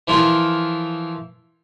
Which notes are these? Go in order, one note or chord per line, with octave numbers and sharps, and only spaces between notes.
E3 F3 E4 F4 A#4